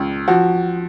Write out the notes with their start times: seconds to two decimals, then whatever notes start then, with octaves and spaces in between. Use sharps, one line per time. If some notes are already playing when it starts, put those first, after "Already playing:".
Already playing: C#2
0.28 F3 F#4